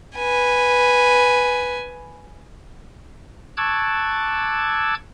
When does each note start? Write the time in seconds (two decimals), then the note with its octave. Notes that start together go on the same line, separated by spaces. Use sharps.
0.17 B4 G#5
3.57 A5 C#6 D6 E6 F#6 G#6